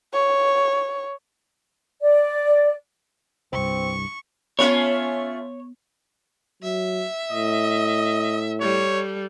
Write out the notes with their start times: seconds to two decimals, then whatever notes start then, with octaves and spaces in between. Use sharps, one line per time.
0.14 C#5
2.00 D5
3.53 C2 G2 C4 C#6
4.59 A3 B3 C#4 F4 C#5
6.63 F#3 E5
7.32 A2 D#5
8.61 G3 A4 C#5